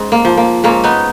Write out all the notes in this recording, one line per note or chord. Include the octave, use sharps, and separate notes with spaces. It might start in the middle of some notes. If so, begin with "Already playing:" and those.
Already playing: G#2 C#4
A#3
F3
A#3
G#2 A#3 C#4
B3 D#4